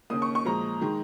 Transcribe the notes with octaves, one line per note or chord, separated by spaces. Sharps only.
D#2 C#3 A#3 D#6
C#6
C#6
A#2 F3 G#3 A#5
D#3 G#3